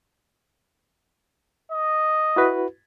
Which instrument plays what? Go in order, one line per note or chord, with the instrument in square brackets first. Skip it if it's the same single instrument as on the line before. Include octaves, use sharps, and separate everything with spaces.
[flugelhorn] D#5
[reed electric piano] E4 F#4 B4